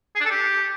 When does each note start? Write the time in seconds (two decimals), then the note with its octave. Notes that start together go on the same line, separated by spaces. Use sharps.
0.15 G#4
0.20 D4
0.25 A4
0.30 G4